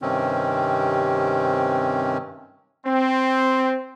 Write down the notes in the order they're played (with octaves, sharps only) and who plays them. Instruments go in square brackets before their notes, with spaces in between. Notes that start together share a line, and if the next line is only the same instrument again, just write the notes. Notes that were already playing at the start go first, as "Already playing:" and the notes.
[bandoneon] G2 C3 D#3 C4 C#4
[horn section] C4